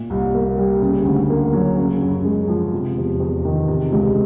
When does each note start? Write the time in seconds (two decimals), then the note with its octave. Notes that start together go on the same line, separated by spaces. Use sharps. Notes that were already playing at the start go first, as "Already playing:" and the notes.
Already playing: A#2
0.10 C2
0.34 A#3
0.57 G3
0.82 C#3
1.05 D2
1.30 A#3
1.53 F#3
1.77 C#3
2.01 F#2
2.25 G#3
2.48 F3
2.73 C3
2.97 E2
3.20 E2
3.45 D#3
3.68 C3
3.92 C#2